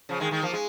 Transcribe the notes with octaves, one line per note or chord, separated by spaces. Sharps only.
C#3 F3
D#3 G#3
D#3 G#3
F3 A#3
G#3